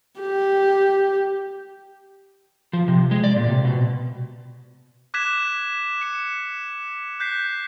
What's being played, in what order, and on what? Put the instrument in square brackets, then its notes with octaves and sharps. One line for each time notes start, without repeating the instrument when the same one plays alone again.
[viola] G4
[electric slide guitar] F3
C3
G#3
D5
A#2
C3
B2
[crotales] D6 F#6 G#6 B6 E7
C#7 E7
F#6 G6 B6 C7